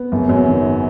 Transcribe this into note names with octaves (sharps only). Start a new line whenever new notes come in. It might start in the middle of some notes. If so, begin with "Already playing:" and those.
Already playing: B3
F#1
F#2
D#3